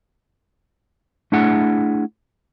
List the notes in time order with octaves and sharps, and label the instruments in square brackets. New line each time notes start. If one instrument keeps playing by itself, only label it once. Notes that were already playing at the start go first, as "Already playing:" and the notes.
[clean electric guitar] A3 D4 E4 G#4 F#5